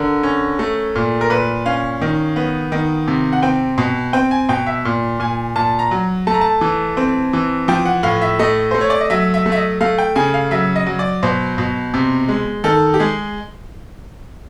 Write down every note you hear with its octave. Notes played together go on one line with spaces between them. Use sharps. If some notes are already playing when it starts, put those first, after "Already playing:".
Already playing: D3 A#4
C#4
A3
A#2
A#4
A#2 B4
C#4 F5
D#3
B3
D#3
C3
F#5
C4 G5
B2
C4 G5
G#5
B2 G5
E5
A#2
A#2 G#5
A#2 A5
A#5
F#3
A3 A5
A#5
A5
E3
C4
E3
F3 G5
F#5
A2 F5
E5
A3 D#5
A3 C5
C#5
D5
D#5
F#3 E5
E5
A3
E5
D#5
A3 F5
G5
C#3 G#5
F5
F#3 E5
D#5
F#3
D5
B2 C5
B2
C3
G#3
D#3 A4
G4
G#3 G#4